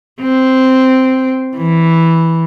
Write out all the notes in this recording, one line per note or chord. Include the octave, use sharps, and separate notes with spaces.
C4
E3